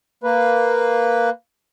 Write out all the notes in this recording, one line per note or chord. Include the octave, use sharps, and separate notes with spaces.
A#3 B4